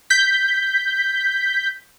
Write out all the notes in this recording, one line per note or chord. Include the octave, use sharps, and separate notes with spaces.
G6 B6